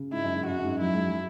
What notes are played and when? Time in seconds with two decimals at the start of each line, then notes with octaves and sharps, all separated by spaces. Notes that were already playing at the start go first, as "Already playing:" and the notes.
Already playing: C#3
0.12 G#2 E4
0.24 F#2
0.35 G#2
0.46 F#2 F#4
0.58 F#2
0.64 G#2
0.81 F#3 E4
0.94 G#3
1.08 F#3